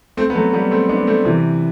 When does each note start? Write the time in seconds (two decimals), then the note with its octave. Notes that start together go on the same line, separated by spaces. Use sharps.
0.17 A3 C4
0.30 B3
0.35 F#3 A3
0.53 G3 B3
0.71 A3 C4
0.89 B3 D4
1.07 A3 C4
1.25 C3 E3